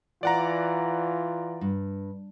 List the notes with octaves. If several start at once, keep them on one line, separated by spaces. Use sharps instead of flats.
E3 F4 D5 F#5 A#5
G2